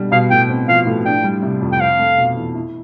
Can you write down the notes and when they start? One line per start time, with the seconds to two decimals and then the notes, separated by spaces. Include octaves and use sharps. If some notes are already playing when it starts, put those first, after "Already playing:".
Already playing: B2 G3 D4
0.12 B2 F5
0.31 A2 G5
0.49 C4
0.68 F3 F5
0.86 A2
1.05 D4 G5
1.24 G3
1.43 C3
1.62 F2
1.72 G5
1.80 C4 F5
1.99 A3
2.18 B2
2.37 E2
2.55 E4